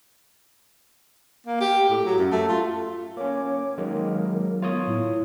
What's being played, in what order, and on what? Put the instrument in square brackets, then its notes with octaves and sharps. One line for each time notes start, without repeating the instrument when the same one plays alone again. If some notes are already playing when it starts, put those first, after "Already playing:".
[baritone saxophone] A#3
G4
A2
F#3
F#2
A3
F4
[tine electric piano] A#3 C#4 [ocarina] C#5 [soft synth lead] D6
[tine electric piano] D#3 G#3 A#3 [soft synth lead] F#3 [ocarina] A#4
[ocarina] B3 [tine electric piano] F4 C#5 D#6
[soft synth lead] A2 [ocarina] E4